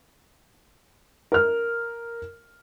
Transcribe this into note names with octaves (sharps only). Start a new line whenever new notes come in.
A#4 F6